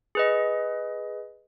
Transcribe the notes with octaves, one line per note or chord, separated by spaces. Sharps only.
G#4 B4 D#5